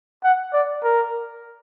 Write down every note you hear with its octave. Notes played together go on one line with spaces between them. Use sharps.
F#5
D5
A#4